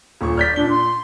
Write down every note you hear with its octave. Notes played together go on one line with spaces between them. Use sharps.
D#1 A#2 C#6
D5 F6 G6 B6
A#2 D4 G7
C6